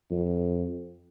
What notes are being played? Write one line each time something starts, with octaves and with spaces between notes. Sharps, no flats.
F2